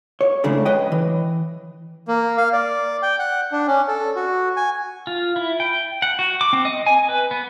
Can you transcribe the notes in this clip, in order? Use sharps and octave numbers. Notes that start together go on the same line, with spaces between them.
C#5
F2 A2 C#3 G#3 A3 D4
B4 C#5 D#5 G5
E3
A#3
F5
D5
G5
F#5
D4
C#4
A4
F#4
G#5
F4
E4
G5
F#5
F#4
D6
C4
D#5
G#5
B4
B3